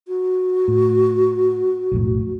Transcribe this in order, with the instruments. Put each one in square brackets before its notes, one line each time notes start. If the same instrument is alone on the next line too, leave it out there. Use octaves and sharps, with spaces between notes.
[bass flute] F#4
[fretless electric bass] A2
B1 F2 A2